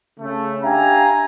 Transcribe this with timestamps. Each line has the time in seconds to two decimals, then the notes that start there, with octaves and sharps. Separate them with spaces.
0.19 C#3 A3
0.63 D4 G4 E5 F5 G#5 A#5